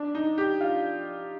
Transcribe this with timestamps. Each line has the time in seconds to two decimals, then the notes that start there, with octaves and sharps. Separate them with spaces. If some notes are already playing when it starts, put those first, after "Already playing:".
Already playing: D4
0.15 D#4
0.38 G4
0.61 F4